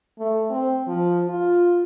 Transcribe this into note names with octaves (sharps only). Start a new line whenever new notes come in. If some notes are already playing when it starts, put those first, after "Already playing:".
A3
C4
F3
F4